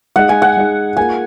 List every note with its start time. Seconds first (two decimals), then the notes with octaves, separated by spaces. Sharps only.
0.16 G#3 D#4 G#4 D#5 F#5
0.29 G#5
0.42 F#5
0.57 G#3 D#4 G#4 D#5
0.97 A#3 F4 G#4 G#5